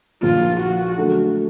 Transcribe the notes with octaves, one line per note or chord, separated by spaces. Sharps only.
A#1 A#2 F3 A#3 F4
F#4
D3 F#3 A3